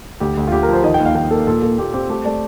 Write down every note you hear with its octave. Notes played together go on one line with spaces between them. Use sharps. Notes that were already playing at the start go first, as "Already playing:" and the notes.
D2 G4
D2
F4
D2 G4
A#4
F3 C5
D#3 D#5
G5
D#2
F5
D#2 G5
A#3 A4
A#2 A4
A#2 A4
A#2 G4
C4 G4
A3 G4
A3 D5